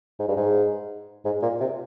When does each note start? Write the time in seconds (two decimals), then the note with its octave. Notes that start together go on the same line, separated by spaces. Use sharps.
0.19 G#2
0.28 G2
0.37 G#2
1.25 G#2
1.42 A#2
1.60 C3